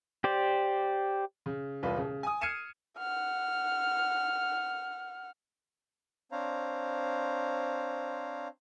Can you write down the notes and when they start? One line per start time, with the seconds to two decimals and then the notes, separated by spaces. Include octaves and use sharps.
0.24 G4 C5 D5
1.46 C#3
1.83 E1 C2 F4 B4
1.98 C#3
2.23 G#5 D#6
2.41 F6 G#6 C7 C#7 D#7 E7
2.99 F#5 F6
6.32 C4 D4 C5 C#5 F5 A#5